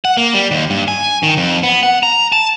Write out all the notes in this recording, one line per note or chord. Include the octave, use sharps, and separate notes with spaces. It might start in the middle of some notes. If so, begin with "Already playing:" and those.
F#5
A#3
G3
D#2
G2
G#5
D#3
F2
B3
F#5
A#5
A5